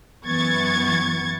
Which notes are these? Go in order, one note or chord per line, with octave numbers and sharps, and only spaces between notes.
F#2 E3 B3 C#6 G#6 A6